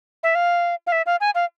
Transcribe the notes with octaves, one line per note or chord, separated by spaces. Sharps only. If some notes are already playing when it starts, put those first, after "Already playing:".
E5
F5
F5
E5
F5
G#5
F5